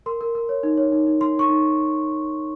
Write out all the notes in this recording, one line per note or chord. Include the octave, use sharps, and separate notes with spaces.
A#4 C6
A#4
A#4
C#5
D#4
C#5
D#4
D#4
D#4 C6
D#4 C#6
D#4